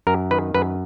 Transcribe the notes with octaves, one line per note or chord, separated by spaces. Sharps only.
F#2 A#4
D#3 B4
F#2 B4